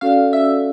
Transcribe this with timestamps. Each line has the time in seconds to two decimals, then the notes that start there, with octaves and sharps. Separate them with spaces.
0.01 C#4 F#4 A4 D5 F5
0.33 E5